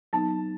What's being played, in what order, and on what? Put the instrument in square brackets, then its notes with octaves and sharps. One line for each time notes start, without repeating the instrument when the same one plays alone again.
[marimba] F#3 B3 D#4 [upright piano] A5